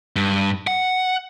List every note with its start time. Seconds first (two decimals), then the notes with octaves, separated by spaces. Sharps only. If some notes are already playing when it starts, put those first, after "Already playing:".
0.16 G2
0.67 F#5